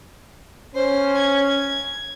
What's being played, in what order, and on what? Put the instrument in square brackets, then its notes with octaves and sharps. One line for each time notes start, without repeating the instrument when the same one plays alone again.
[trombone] C#4 [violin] C5
[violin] G#6